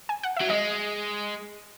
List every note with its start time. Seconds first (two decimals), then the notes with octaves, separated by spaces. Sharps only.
0.09 G#5
0.23 F#5
0.37 F#3 E5
0.50 G#3 D#5